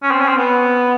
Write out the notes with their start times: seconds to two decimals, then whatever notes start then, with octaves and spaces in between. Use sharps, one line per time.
0.03 C#4
0.11 C4
0.20 C#4
0.28 C4
0.37 B3